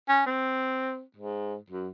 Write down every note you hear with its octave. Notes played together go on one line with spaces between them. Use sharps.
C#4
C4
G#2
F#2